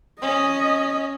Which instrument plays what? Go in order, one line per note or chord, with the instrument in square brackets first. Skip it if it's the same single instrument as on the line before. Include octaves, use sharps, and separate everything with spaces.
[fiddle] C#4 [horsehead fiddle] D#5